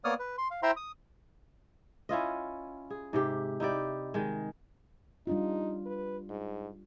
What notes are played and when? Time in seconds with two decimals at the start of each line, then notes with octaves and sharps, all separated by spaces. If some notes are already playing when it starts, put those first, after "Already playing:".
0.04 A#3 B3 C#5 D5 D#6 F6
0.19 B4
0.38 C6
0.51 F5
0.63 E4 C5 E5 G5 A#5 C6
0.77 D#6
2.09 C#4 E4 F4 D#5
2.90 G#4
3.13 G#2 C3 G4
3.60 D#4 E4 G4 D5
4.14 D#3 G#3
5.27 G3 D4 D#4 F4
5.86 B4
6.30 G#2